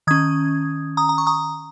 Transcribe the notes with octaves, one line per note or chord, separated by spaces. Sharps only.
D#3 C#4 D#6 G#6
A#5 D#6
A#5
C#6
A#5 D#6